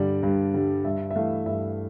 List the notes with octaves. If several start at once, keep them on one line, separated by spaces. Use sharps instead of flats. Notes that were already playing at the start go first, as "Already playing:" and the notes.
Already playing: G2 D3 G3 D5
G2
D3 G3
G2 E5
E5
E3 A3 F5
G2 E5